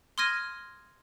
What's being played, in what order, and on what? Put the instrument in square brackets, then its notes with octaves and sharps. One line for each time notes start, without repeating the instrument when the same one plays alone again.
[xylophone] C6 D#6 F6 G#6 A#6 D#7